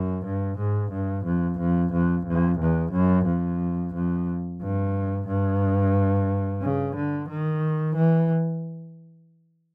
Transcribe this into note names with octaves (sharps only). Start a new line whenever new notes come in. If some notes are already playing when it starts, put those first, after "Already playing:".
Already playing: F#2
G2
G#2
G2
F2
F2
F2
F2
E2
F#2
F2
F2
G2
G2
C#3
D3
D#3
E3